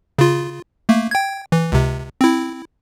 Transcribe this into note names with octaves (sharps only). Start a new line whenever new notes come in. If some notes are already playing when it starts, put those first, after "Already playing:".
C#3 F4
A3 A#3
G5 G#6
E3
C#2 C3
C4 E4